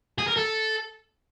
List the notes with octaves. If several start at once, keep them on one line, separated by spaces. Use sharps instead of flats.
G#4
A#4
A4